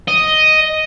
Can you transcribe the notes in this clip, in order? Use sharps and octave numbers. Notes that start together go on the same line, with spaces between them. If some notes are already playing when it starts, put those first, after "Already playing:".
D#5